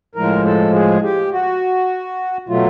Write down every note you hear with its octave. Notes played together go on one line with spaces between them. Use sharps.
A2 F3 G#3 A#4
A4
G#4
G4
F#4
B2 F#3 A3 F4